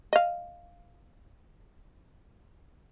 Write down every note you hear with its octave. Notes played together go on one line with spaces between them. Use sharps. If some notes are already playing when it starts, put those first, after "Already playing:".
D#5 F5